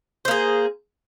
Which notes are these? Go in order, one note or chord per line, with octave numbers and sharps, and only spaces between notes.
A#3 G#4 C5